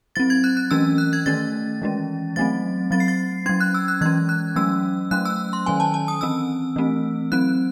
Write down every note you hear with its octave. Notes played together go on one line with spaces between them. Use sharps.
F#3 C4 A6
G#6
F#6
F#6
E3 A3 C#4 E6
F#6
G#6
D#3 A3 C#4 A6
E3 G#3 C#4
F#3 A3 C4 A6
F#3 C4 A6
C7
A6
F#3 C#4 G#6
F#6
E6
F#6
E3 G#3 C#4 G#6
F#6
F#3 A3 C#4 E6
F#3 A3 C#4 F#6
E6
C6
D#3 F#3 C#4 G#5
A5
A5
D#6
E3 C4 E6
E3 A3 C4
F#3 C4 F#6